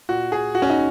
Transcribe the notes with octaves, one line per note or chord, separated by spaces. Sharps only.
A#2 F#4
G#4
F#4
C#4
D#4